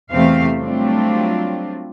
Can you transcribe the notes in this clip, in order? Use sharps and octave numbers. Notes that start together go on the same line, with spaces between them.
E2 C3 E3 A3 C4 F5
F#3 G3 A3 C4 D4 F4